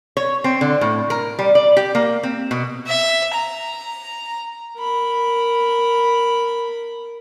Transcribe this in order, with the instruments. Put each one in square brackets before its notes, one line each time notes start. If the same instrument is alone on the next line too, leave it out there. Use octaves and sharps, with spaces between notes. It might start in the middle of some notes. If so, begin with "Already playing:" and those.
[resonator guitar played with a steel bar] C#5
C4
D3
A2
A#4
G3
D5
G4
A#3
C4
B2
[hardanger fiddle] E5
A#5
[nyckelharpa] A#4 B5